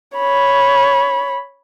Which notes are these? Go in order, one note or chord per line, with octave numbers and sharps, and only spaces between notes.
C#5 B5